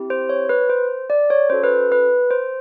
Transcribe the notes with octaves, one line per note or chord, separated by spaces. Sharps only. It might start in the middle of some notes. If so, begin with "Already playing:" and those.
Already playing: C4 E4 G4
C5
C#5
B4
C5
D5
C#5
C#4 F#4 A4 C5
B4
B4
C5